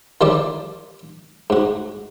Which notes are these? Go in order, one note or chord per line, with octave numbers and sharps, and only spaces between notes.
D#3 F3 G3 E4 C5 D5
G#2 F#4